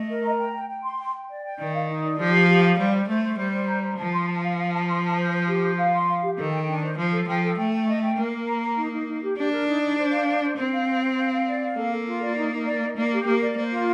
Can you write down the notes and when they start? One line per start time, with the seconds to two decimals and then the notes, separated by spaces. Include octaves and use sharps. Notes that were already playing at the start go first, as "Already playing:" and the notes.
Already playing: A3 D#5
0.09 A#4
0.24 A#5
0.39 G5
0.54 G5
0.69 G5
0.84 C6
0.99 G5
1.14 G5
1.29 D5
1.43 G5
1.59 D#3 D5
1.74 F5
1.89 D#4
2.03 D5
2.18 F3 G4
2.34 F5
2.48 G4
2.64 F5
2.78 G3 C5
2.93 C5
3.08 A3 C5
3.24 C5
3.38 G3 C5
3.53 C5
3.68 A#5
3.83 C5
3.98 F3 A5
4.13 C6
4.28 A5
4.43 F5
4.58 F5
4.73 A5
4.88 C6
5.03 A5
5.18 C5
5.33 C5
5.48 G4
5.63 C5
5.78 F5
5.93 C6
6.08 F5
6.23 G4
6.37 D#3 A4
6.53 G5
6.67 D4
6.83 C5
6.98 F3 C5
7.13 A4
7.28 F3 G5
7.43 A4
7.57 A3 G5
7.73 G5
7.88 D#5
8.02 G5
8.17 A#3 A#4
8.32 A#4
8.47 A#5
8.63 A#5
8.77 D#4
8.92 D#4
9.08 D#4
9.22 G4
9.38 D4 G4
9.52 A#4
9.67 D#4
9.82 D#4
9.97 C5
10.12 F5
10.27 C5
10.42 C5
10.57 C4 C5
10.73 F5
10.87 C5
11.02 C5
11.17 F5
11.32 F5
11.47 D5
11.62 F5
11.77 A#3 A4
11.92 A4
12.07 F4
12.22 D5
12.37 D#4
12.52 D#4
12.66 D5
12.81 D#4
12.97 A#3 D5
13.12 G4
13.26 A#3 A#4
13.41 D5
13.57 A#3 C5
13.71 F4